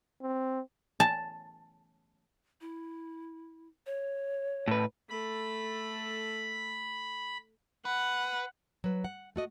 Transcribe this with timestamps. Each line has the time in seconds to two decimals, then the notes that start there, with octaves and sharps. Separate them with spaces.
0.22 C4
1.00 A5
2.61 E4
3.86 C#5
4.68 A2 B4
5.10 A3 A4 B5
7.85 B4 F#5
8.84 F#3 B4
9.04 F#5
9.36 A3 F#4 D#5